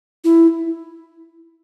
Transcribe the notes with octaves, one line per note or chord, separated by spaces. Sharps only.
E4